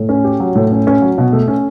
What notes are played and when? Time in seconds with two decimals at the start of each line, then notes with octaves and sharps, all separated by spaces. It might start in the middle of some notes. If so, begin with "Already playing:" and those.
Already playing: A2
0.09 C#4
0.24 G4
0.40 F#3
0.55 A2
0.71 C#4
0.87 C#4
1.02 F#3
1.18 B2
1.33 A3
1.48 C#4